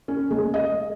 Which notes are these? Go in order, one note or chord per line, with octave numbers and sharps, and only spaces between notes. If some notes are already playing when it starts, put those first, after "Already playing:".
C#4
G#3
D#5